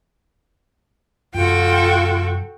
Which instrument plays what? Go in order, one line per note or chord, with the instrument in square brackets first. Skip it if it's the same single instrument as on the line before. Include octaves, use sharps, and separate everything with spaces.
[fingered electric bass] F#2 C3 [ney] F4 [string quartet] F#4 A4 G5